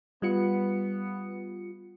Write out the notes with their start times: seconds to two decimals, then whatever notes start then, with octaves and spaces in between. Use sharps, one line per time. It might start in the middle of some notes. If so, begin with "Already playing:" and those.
0.22 G3 B3 F4 C#7